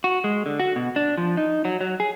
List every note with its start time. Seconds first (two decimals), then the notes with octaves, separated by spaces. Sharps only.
0.04 F#4
0.24 G#3
0.46 D3
0.60 F#4
0.76 B2
0.96 D4
1.18 F3
1.37 D#4
1.65 F#3
1.81 F#3
2.00 G#4